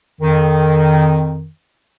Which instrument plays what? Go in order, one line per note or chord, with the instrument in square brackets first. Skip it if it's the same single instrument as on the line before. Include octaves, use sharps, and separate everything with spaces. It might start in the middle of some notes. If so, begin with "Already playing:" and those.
[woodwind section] F2 D#3